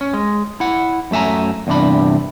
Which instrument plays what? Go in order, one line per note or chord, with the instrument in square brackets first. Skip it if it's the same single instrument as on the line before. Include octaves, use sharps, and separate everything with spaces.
[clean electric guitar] C#4
G#3
E4 F#5
F#2 A3 E5 G#5 A#5
E2 G2 C3 D4 B5